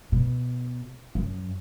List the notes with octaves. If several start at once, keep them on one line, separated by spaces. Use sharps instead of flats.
B2
F#2